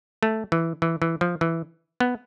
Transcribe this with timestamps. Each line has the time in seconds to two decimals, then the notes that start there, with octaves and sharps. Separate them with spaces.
0.23 A3
0.52 E3
0.82 E3
1.02 E3
1.21 F3
1.41 E3
2.00 B3